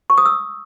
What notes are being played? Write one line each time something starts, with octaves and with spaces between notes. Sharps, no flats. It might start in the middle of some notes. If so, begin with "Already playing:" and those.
C#6
D#6
E6